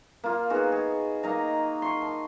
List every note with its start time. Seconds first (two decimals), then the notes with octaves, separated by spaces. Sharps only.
0.24 A#3 F4
0.50 B3 D#4 F#4 G#4
0.72 G#4
1.23 A#3 D#4 D#5 A#5
1.82 C6 C#6
2.02 A5